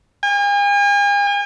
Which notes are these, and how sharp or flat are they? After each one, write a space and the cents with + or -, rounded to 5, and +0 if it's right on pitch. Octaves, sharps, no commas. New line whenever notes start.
G#5 -45